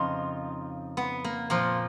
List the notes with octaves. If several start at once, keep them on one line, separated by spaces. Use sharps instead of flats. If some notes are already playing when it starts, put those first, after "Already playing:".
Already playing: F2 C#3 F3 D#4 F4
B3
A#3
A#2 F3 A#3